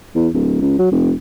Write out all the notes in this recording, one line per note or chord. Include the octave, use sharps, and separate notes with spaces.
E2
D1
C#2
F#3
F1